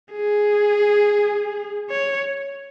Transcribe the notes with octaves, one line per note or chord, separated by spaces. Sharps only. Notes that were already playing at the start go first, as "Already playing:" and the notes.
G#4
C#5